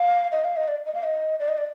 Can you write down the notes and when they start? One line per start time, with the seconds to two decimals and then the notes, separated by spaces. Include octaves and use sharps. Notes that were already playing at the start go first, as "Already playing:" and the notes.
Already playing: F5
0.32 D#5
0.44 F5
0.56 D#5
0.68 D5
0.86 D#5
0.95 F5
1.03 D#5
1.39 D5
1.48 D#5
1.58 D5